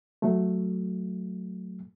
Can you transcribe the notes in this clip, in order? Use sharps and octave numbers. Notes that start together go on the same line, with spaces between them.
F#3 A3